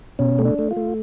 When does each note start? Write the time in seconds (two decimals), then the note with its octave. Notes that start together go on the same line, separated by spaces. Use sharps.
0.19 B2 C#4
0.39 A3
0.45 D4
0.59 A3
0.71 F4
0.77 A3